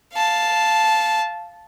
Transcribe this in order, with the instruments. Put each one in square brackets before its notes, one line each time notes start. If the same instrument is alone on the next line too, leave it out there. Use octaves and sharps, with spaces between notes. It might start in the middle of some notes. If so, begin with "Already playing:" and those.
[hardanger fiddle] F5 A5